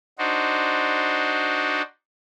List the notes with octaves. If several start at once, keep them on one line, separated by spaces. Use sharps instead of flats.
D4 D#4 F#4 C5